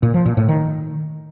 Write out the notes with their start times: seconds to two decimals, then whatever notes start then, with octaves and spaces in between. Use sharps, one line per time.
0.03 A#2
0.14 F3
0.26 A#2
0.37 A2
0.48 D#3